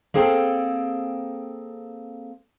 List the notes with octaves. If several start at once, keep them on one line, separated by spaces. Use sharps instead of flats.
A#3 C4 G#4 A4 G5